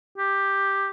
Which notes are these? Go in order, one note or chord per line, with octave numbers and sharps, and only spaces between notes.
G4